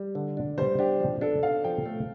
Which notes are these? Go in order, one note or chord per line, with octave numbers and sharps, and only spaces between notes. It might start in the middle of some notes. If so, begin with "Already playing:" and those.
Already playing: G3
D3
D4
G3 C5
D4 G4
F3
D4 A4
D4 F5
F3 G5
A3